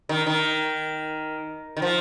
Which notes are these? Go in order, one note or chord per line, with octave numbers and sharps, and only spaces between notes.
D#3
D#3
D#3
F3